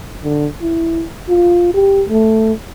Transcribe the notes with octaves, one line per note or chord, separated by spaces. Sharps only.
D3
E4
F4
G4
A3